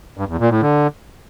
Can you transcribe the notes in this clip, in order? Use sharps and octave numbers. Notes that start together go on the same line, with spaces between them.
G2
E2
A#2
A2
D3